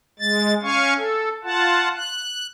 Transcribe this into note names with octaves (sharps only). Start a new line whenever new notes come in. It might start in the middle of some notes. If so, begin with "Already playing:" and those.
G#3 A6
C#4 F5 G#5 C#6
A4
F4 F#5 A5
F#6